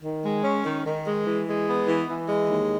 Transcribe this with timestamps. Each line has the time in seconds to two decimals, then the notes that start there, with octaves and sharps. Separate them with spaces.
0.03 D#3
0.24 G#3
0.44 C#4
0.65 D#3
0.86 D#3
1.06 G#3
1.27 E3
1.47 G#3
1.68 B3
1.88 E3
2.08 E3
2.29 G#3
2.50 D#2